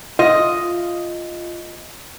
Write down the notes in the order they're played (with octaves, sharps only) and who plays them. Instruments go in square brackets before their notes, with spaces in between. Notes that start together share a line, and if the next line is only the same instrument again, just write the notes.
[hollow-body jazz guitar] F4 [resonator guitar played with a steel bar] D#5